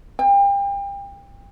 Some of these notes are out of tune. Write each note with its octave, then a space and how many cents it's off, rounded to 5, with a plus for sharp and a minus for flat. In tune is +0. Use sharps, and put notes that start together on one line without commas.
G5 +30